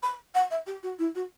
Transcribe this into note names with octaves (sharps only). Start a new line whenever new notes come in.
B5
F#5
E5
G4
F#4
E4
F#4